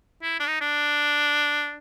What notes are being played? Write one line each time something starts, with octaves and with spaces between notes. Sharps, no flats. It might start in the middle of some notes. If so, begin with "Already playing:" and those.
E4
D4
D#4
D4